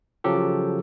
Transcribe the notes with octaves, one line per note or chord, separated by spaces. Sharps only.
C#3 F3 F#3 G4 A4